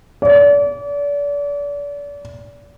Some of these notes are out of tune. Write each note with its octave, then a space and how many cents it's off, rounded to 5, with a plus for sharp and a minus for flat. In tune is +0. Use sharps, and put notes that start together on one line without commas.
D5 -35